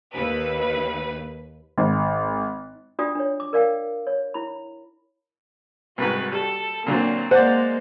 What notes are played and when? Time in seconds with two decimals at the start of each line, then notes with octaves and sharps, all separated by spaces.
0.12 D#2 B4
1.78 G#1
2.99 D4 F4 F#4 D5 G5 D#6
3.15 D4 C#5
3.40 D6
3.53 A#4 D5 F5 G5
4.07 C#5
4.34 E4 B5
5.98 C2 G#2 F#4 B4
6.32 G3 A4
6.87 A#2 D3 F#3 A#3 C4
7.31 G#3 A#3 C5 D5 F#5